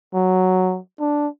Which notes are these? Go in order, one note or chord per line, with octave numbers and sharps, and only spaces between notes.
F#3
D4